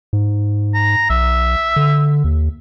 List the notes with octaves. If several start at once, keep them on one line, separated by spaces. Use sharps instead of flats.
G#2
A#5
B1 E5
D3
D#2